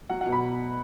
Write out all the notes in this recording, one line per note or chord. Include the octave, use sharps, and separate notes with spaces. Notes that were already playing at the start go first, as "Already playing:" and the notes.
F#3 F#5
F#5
B2
B5